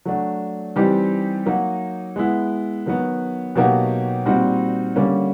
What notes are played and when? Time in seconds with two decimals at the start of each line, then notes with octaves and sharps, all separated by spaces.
0.05 F#3 A3 D4
0.76 E3 G3 C4 D#4 G4
1.46 F#3 A#3 D#4
2.16 G#3 B3 E4
2.86 D#3 F#3 B3
3.55 B2 F#3 A#3 D#4 G4
4.26 A#2 G3 C4 D#4 F#4
4.96 D3 G3 A#3 C#4